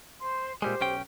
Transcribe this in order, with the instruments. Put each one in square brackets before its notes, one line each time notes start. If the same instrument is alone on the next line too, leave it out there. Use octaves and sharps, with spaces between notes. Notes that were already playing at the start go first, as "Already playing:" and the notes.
[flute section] C5 C6
[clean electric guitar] A#2 G3 G#3 [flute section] G4 C5
[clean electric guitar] B1 C#4 G5